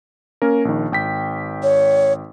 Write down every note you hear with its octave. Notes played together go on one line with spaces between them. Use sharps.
A#3 C#4 A#4
A#1 D#3
G#1 G5 B6
C#5